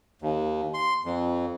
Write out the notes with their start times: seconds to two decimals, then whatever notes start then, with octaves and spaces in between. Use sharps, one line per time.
0.22 D#2
0.74 C6
1.05 F2